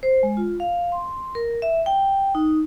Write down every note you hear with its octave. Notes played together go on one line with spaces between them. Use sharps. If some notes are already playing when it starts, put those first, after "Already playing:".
C5
G#3
F4
F5
C6
A#4
E5
G5
D#4